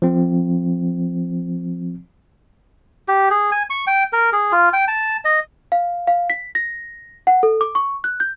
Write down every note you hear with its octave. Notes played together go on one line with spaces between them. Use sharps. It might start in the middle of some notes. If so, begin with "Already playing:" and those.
F3 C4
G4
G#4
G#5
C#6
G5
A#4
G#4
F4
G5
A5
D#5
F5
F5
B6
A#6
F#5
A4
D6
C#6
F#6
G6